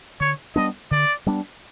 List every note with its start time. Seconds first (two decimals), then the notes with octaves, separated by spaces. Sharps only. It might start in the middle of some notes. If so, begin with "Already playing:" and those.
0.20 D3 C#5
0.56 G3 B3 D4 D#5
0.91 D3 D5
1.27 G3 B3 D4